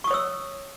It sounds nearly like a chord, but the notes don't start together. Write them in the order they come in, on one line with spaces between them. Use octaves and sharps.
C#6 D#6 C#5 E6